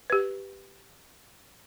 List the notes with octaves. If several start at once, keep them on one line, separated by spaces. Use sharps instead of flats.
G4 B4